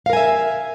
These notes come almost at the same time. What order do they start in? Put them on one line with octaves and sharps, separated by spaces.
F5 A#4 G#5 E5